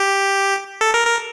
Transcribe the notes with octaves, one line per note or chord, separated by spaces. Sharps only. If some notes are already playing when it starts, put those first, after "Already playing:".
Already playing: G4
A4
A#4
A#4